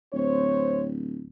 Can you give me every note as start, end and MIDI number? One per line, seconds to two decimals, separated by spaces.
0.13 1.29 26
0.13 0.86 60
0.13 0.86 72
0.13 0.86 73